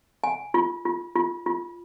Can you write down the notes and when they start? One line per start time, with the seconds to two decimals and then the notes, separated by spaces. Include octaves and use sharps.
0.24 G#5
0.54 F4
0.85 F4
1.16 F4
1.46 F4